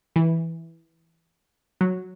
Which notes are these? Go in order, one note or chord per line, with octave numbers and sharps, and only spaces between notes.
E3
F#3